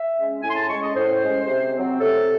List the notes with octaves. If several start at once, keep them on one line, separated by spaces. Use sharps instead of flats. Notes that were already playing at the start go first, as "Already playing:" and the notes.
Already playing: E5
G#3 C#4
A2 G#5
C6
A5
G#3 C#4 C#6
D#5
A2 C5
G#3 C#4
C3
F#3 C4
C3 A4